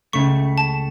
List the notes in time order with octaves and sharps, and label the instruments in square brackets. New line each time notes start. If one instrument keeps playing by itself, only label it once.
[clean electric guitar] C#2 C#3 A3 [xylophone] C#6
[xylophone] A5